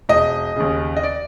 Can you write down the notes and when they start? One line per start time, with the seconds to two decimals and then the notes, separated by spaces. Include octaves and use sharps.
0.09 E1 D#5
0.56 D#2 C#3
0.96 D#5
1.03 D5